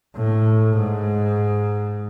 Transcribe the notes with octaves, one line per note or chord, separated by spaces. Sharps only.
A2
G#2